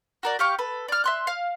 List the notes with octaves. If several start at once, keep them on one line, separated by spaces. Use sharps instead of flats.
F#4 A#4 D5
G4 F5 C#6
A4 B4
D5 F6
E5 C6 F#6
F5